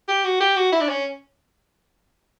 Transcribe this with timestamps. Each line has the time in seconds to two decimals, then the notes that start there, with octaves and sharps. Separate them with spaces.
0.08 G4
0.24 F#4
0.40 G4
0.56 F#4
0.72 E4
0.81 D4
0.88 C#4